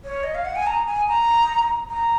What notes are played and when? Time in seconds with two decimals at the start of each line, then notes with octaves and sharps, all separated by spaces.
0.05 C#5
0.24 D#5
0.35 F5
0.45 F#5
0.56 G#5
0.67 A#5
0.87 G#5
1.08 A#5
1.90 A#5